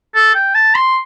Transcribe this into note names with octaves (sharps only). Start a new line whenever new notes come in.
A4
G5
A5
C6